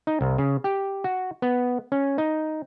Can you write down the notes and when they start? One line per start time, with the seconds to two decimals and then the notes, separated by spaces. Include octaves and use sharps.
0.07 D#4
0.21 C2
0.38 C#3
0.64 G4
1.04 F#4
1.42 B3
1.92 C#4
2.18 D#4